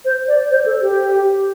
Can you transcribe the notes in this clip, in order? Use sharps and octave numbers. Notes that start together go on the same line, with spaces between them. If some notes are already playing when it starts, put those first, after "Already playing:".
C5
D5
C5
A4
G4